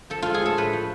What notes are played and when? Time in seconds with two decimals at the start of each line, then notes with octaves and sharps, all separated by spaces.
0.10 F3 A4
0.22 G#3 F4
0.34 G#4
0.41 A2 A4
0.58 A2 B4
0.73 F3